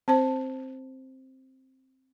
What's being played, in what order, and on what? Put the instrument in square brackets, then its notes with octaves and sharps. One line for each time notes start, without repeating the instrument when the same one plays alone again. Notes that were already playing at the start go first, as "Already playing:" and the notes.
[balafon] C4 C5 A5